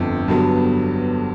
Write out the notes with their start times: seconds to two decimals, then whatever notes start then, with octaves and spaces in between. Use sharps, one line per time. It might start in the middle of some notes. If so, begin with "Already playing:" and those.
Already playing: G1 F2 D3
0.27 G1 G2 D3 F#3 B3